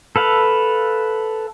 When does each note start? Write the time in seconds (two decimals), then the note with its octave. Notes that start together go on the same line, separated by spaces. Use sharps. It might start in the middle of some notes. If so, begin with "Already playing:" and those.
0.16 A4 B4 F5